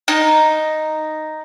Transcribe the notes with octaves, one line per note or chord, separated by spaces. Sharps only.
D#4